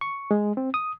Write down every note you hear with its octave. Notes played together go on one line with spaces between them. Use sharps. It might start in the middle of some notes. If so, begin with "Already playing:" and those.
C#6
G#3
C4
D#6